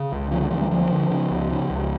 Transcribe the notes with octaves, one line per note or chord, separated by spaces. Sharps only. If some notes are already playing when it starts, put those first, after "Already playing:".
Already playing: C#3
C#2
D3 F3
G3
D2 E3
G3
D2 F3
D3
C#3
C#2
C#3
C#2